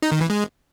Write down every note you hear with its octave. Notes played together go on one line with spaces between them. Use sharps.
D#4
D#3
E3
G#3